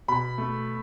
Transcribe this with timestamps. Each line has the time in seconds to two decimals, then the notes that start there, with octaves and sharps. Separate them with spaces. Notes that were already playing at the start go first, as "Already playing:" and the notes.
0.08 B2 B5
0.38 A3